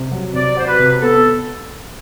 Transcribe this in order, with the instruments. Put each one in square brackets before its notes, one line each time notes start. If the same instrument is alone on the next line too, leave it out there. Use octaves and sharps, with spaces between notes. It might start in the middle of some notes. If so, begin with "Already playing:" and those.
Already playing: [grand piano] C3
F#3
[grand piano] C3 [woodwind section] D5
[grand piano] F#4 [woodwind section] C5
[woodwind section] B4
[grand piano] C3
[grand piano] B3 [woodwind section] A4